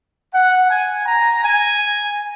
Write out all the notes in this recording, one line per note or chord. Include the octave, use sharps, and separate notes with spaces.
F#5
G#5
A#5
G#5